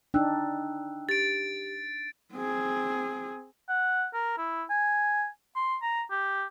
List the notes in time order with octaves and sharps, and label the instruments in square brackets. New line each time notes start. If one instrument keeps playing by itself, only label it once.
[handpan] D4 D#4 [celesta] G5 E6 F#6
[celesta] G4 [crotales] A6 D7
[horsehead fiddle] C4 G#4
[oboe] F#5
A#4
E4
G#5
C6
A#5
G4